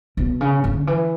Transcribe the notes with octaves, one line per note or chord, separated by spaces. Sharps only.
B2
C#3
D3
E3